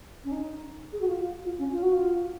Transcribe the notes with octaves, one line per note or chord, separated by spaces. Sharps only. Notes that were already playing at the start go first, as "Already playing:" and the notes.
C#4
D#4
G#4
F#4
F4
F4
C#4
F4
F#4
F4